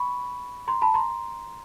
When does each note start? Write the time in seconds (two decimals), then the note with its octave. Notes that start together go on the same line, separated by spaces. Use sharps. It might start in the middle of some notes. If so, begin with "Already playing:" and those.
Already playing: B5 C#6
0.68 A#5 C6
0.82 A5 B5
0.94 A#5 C6